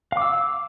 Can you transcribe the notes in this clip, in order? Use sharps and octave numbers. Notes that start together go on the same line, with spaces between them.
F5 D6 E6